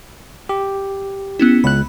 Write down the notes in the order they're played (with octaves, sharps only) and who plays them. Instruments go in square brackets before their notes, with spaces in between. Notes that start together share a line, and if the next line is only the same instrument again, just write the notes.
[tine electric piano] G4
[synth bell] B3 C#4 E4
[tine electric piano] C#2 F#6 [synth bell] B5